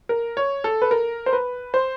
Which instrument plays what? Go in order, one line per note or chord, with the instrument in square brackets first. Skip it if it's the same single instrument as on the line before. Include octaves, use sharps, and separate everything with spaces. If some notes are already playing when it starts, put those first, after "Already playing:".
[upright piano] A#4
C#5
A4
B4
A#4
C5
B4
C5